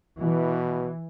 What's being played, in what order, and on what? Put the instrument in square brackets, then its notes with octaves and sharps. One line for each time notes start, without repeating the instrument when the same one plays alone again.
[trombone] B2 [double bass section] E3